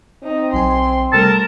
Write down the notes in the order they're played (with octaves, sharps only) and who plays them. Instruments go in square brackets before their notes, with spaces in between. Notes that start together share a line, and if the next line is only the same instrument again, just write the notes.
[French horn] C4 [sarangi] D#4
[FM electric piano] B1 F#3 G#5 [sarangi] C6
[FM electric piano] C3 G3 A3 [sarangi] A#4 [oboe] A5